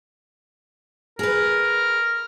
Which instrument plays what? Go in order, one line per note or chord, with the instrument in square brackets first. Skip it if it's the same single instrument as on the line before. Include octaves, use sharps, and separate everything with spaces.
[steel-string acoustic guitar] G#4 B4 [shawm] A#4